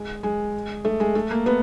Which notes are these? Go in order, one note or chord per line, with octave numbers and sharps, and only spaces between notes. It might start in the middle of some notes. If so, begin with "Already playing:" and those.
Already playing: G#3
G#3
A3
G#3
A3
A#3
B3